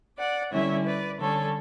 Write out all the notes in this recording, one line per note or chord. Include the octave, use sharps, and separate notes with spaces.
D5 F#5
D3 G3 C#4 E4 C#5 E5
B4 D5
D3 G3 C#4 A4 C#5